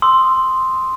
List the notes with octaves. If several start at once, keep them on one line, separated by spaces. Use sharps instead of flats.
C6 D#6 E6